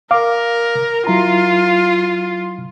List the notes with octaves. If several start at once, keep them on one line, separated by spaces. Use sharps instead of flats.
A#4 F5 D6
F#3 E4 F4 A#5